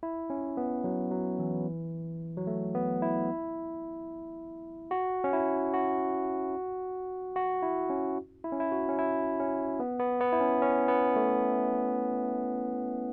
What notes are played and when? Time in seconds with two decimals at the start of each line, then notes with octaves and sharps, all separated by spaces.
0.03 E4
0.30 C#4
0.57 B3
0.84 F#3
1.11 F#3
1.39 E3
2.37 F#3
2.47 A3
2.75 B3
3.02 E4
4.91 F#4
5.24 C#4
5.33 E4
5.74 F#4
7.36 F#4
7.62 E4
7.90 C#4
8.44 E4
8.52 C#4
8.60 E4
8.72 F#4
8.88 C#4
8.99 E4
9.40 C#4
9.80 B3
10.00 B3
10.21 B3
10.32 E4
10.40 C#4
10.62 C#4
10.88 B3
11.16 A3